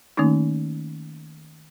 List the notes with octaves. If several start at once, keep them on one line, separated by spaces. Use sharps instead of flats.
D#3 A3 A#3 C#4 D#4